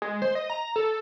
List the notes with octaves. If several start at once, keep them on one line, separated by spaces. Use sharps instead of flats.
G#3
C5
D#5
A#5
A4